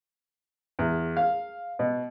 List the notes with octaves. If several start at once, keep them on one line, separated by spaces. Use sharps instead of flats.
E2
F5
B2